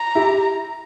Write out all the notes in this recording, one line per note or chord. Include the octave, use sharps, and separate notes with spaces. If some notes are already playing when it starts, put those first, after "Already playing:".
Already playing: A#5
E4 G4